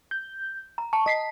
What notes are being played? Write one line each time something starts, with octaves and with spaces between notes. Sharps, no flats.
G6
A#5
A5 C#6
D#5 B6 C7